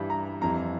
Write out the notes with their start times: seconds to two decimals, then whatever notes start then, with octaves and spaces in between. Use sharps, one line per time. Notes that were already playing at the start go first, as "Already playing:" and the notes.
Already playing: G2 E3 G3
0.10 A#5
0.41 F2 E3 G3 A#5